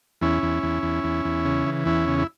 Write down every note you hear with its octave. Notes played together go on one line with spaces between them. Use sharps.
E2 C#4 E4
E2
E2
E2
E2
E2
C#3
E3
E2 C#4 E4
C#3
E4